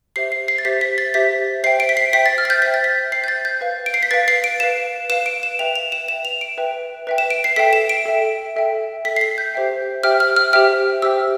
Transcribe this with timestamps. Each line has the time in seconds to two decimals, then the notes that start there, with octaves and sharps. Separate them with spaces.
0.16 G4 C5 E5 C7
0.32 C7
0.48 C7
0.58 A6
0.65 G4 C5 E5 B6
0.81 B6
0.98 A6
1.14 G4 C5 E5 B6
1.64 C5 E5 G5 C7
1.80 D7
1.89 B6
1.97 C7
2.13 C5 E5 G5 B6
2.26 A6
2.38 F6
2.45 A6
2.50 G6
2.62 C5 E5 G5 B6
2.74 A6
2.84 B6
3.12 C5 E5 G5 C7
3.24 G6
3.28 A6
3.45 G6
3.61 B4 F5
3.86 D7
3.94 C7
4.03 B6
4.11 B4 F5 A6
4.28 C7
4.44 D7
4.60 B4 F5 E7
5.10 B4 F5 E7
5.26 D7
5.43 E7
5.59 B4 E5 G5 F7
5.76 F7
5.92 E7
6.08 B4 E5 G5 E7
6.25 F7
6.41 D7
6.58 B4 E5 G5
7.07 B4 E5 G5
7.18 E7
7.30 D7
7.44 C7
7.56 A4 E5 G5 B6
7.73 E7
7.89 D7
8.06 A4 E5 G5
8.56 A4 E5 G5
9.05 A4 E5 G5 B6
9.16 C7
9.21 B6
9.38 G6
9.54 G4 C5 E5 G5
10.03 G4 C5 E5 G5 F6
10.20 F6
10.36 F6
10.53 G4 C5 E5 G5 F6
11.02 G4 C5 E5 G5 E6